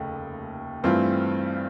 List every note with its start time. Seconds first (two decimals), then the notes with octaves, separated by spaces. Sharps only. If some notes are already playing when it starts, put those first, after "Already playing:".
Already playing: F1 D#2 C#3 A3
0.84 G2 E3 A3 C4 F4